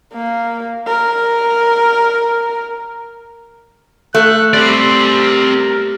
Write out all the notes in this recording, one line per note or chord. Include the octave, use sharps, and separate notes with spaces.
A#3
A#4
A3 F#6
G3 C4 D5 C6
A#4